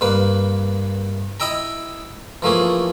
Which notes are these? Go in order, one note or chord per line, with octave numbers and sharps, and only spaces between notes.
G2 A#3 B4
E4 D#5 E5 G5 A#5
E3 F3 A3 A#3 C#4 G#4